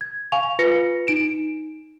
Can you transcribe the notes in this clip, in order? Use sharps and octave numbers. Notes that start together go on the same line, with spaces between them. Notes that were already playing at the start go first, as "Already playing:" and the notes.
G#6
F5 G#5 C#6 F7
F4 B4 A#6 C#7
D#4 D7 E7